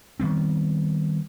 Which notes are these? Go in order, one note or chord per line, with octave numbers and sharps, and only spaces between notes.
D#3 G3 B3 C4